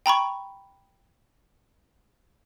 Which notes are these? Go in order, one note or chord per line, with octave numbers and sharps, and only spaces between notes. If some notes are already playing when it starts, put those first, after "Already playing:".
G5 A#5 B5 C#6